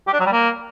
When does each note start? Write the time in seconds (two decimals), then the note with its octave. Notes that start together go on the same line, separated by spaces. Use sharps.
0.07 G4
0.14 D4
0.20 F#3
0.26 G3
0.33 A#3